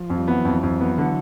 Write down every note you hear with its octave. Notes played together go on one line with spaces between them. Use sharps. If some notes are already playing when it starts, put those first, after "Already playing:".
Already playing: F3
F2
G3
E3 F#3 B3
F2
F2
B3
D3